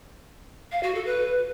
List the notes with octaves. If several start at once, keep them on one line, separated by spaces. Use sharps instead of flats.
F5
F#4
A4
B4